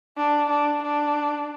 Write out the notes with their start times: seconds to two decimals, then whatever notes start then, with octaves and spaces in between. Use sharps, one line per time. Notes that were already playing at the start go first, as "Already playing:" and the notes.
0.17 D4
0.50 D4
0.83 D4